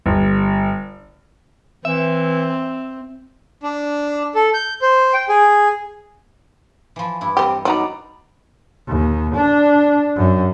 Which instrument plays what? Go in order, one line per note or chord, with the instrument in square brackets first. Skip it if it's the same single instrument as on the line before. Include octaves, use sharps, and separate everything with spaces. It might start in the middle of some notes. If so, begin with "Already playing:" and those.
[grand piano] G1
[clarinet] E3 [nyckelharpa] C4 [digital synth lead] E5
[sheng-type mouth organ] D4
A4
G6
C5
G5
G#4
[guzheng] E3 F3
G2 E4
[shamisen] C4 G4 [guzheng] A4 D#5
[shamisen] F#3 D#4 A#5 [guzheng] B3 G4 D5
[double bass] D#2
D4
F#2